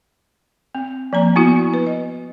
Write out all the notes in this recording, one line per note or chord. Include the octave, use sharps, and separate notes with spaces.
C4
F3 A#3 A#5
B3 E4 F#4
B4
D#5